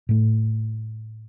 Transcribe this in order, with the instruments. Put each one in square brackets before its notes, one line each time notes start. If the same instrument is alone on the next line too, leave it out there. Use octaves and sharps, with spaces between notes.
[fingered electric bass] A2 A3